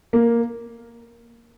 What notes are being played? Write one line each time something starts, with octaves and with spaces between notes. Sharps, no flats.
A#3